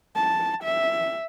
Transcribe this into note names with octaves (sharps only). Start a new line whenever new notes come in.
A5
E5